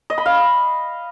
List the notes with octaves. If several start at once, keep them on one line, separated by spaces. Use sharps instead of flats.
D#5
B5
F5